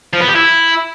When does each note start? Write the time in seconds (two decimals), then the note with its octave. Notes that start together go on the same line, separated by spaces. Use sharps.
0.13 F3
0.20 B3
0.28 G4
0.35 E4